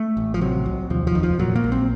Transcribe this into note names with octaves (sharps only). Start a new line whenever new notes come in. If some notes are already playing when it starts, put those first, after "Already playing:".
Already playing: A3
A1
F3
C3 F#3
C2
D#2 F3
F3
F1 D#3
F3
A#2 F#3
A#3
A#1
C4